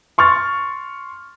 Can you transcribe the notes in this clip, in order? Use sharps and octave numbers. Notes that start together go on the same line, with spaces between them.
C6 C#6 F6 A6